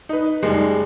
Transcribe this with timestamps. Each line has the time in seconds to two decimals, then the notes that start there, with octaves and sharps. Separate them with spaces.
0.09 D#4 B4
0.43 F#1 G3 G#3 D#4